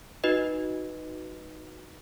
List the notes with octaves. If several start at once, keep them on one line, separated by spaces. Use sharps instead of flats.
D#4 F#4 B4 D#5